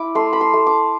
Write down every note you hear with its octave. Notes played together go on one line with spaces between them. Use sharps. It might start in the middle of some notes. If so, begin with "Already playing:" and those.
Already playing: E4 D6
A3 C6
B5
C6
A3
D6